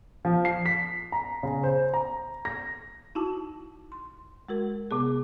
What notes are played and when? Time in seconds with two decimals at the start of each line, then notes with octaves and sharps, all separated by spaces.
0.25 F3
0.45 C7
0.66 B6
1.12 A#5
1.43 C#3
1.64 C5
1.94 A#5
2.45 A#6
3.15 D#4 E4 F#4 A5
3.92 C6
4.49 G#3 F#4 A#4
4.91 C3 B3 G#4